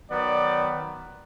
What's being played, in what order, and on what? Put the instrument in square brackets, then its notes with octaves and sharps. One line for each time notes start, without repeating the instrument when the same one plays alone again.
[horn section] D#3 F#3 B3 D5